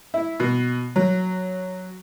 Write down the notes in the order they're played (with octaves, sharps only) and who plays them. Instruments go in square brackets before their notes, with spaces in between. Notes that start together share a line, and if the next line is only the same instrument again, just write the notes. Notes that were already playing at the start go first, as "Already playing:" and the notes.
[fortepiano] E4
B2
F#3